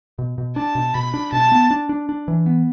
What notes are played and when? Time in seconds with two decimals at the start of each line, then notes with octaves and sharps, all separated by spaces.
0.19 B2
0.38 B2
0.56 D4 A5
0.75 B2
0.94 B2 B5
1.14 D4
1.32 B2 A5
1.52 B3
1.70 D4
1.89 D4
2.09 D4
2.28 E3
2.46 B3